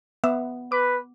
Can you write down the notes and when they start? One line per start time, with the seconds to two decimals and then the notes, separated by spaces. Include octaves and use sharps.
0.24 B3 E5
0.72 B4 D6